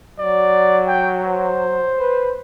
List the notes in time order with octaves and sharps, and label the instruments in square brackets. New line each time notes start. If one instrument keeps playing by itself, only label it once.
[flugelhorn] F#3 [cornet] D5
[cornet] G5
C5
[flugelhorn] B4